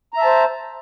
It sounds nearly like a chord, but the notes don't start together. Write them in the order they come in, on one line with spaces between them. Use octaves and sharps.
A#5 E5 A5 C5